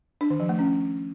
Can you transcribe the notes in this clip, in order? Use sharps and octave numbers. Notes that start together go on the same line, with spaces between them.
D4
D#3
F3
A3
C#4